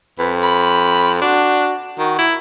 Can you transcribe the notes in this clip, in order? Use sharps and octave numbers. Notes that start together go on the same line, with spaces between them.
F2 B4
B5
D4 F#4
D#3 F#4
E4